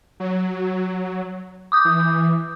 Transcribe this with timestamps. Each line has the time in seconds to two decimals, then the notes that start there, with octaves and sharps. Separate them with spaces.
0.20 F#3
1.72 D6 D#6 G6
1.85 E3